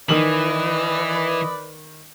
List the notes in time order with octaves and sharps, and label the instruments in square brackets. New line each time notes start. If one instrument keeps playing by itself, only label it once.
[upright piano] D#3 F#7 [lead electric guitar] E3 [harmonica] B4 D5 [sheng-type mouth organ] D#5